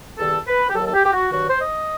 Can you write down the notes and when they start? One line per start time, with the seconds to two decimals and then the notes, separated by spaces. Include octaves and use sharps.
0.18 E2 D#3 G3 A4
0.47 B4
0.69 G4
0.75 D#2 D#3 F#3 A4
0.86 A4
0.93 G4
1.05 G4
1.13 F#4
1.31 G2 D#3 F#3 F#4
1.49 C5
1.60 D#5